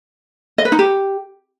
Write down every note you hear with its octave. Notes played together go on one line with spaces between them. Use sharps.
D#5
B4
D#4
G4